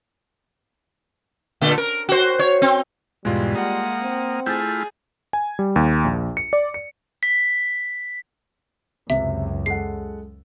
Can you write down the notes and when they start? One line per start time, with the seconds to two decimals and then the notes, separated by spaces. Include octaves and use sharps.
1.61 A#2 D3 A3
1.78 A#4
2.09 F#4 C5
2.39 C#5
2.62 C4
3.25 E2 G#2 B2 G3 G#3 F4
3.55 A#3 F#5 D#6
4.02 C4
4.46 A3 E4 F4 G#4 G6 A6
5.33 G#5
5.59 G3
5.76 D#2
6.04 A#1
6.37 C#7
6.53 D5
6.74 C#7
7.23 B6
9.10 C#2 F#2 C3 E5
9.66 G#3 A4 F#5 C7